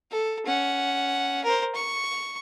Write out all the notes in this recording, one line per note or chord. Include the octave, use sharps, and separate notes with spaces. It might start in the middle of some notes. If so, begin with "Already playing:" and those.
A4
C#4 F#5
A#4 C5
C#6